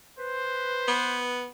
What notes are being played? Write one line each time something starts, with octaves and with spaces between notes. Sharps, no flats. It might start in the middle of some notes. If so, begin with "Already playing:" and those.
B4 C5
B3